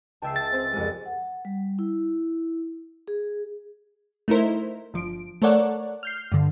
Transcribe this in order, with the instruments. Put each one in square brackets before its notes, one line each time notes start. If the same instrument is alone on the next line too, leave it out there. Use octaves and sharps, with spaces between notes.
[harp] C#2 E5 C7 [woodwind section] G5 A5
[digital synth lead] A6
[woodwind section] C4
[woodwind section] C2 [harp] F2 G#3
[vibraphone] F#5
G3
E4
G#4
[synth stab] A3 D#4 E4 A#4 C5
G1 F3 D7
A3 A4 A#4 C#5 D5 F#5
F6 G6 C7
G2 D3